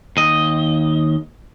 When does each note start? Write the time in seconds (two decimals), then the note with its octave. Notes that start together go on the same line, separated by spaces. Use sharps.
0.17 D#2 D#5